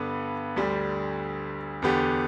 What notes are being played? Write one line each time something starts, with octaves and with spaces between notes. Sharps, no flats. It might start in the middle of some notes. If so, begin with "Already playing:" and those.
Already playing: G2 D3 B3 D4
D2 D3 G3
E2 D3 B3 G4